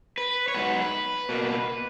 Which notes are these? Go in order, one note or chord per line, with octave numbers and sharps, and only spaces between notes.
B4
C#5
G#2 F#3 B3 B4
B2 A#3